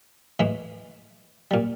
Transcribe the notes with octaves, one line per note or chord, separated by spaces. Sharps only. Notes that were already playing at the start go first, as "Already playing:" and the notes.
A2 E3 G#3
A#2 G3